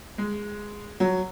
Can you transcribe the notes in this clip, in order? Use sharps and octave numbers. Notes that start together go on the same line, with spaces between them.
G#3
F#3